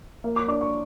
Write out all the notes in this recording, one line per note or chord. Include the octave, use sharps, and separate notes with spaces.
A#3
D6
D4 D6
C#6